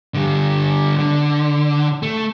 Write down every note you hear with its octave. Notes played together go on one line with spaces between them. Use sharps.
D3 G3
D3
A3